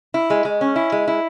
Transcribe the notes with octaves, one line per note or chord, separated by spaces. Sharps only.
E4
G#3
G#3
C#4
E4
G#3
E4